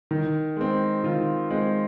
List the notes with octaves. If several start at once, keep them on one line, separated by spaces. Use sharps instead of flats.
D#3
G#3 C4
D#3 F4
G#3 C4